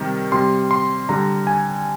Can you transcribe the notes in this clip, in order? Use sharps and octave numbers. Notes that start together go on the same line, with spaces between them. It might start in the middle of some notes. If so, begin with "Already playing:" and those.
Already playing: C3 D#3 G3
C3 G3 C6
C6
D3 G3 A#5
G#5